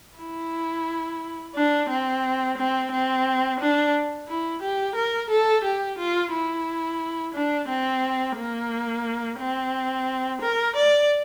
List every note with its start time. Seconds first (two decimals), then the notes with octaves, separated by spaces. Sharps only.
0.18 E4
1.55 D4
1.89 C4
2.57 C4
2.92 C4
3.60 D4
4.28 E4
4.62 G4
4.95 A#4
5.30 A4
5.64 G4
5.98 F4
6.32 E4
7.34 D4
7.69 C4
8.37 A#3
9.39 C4
10.41 A#4
10.76 D5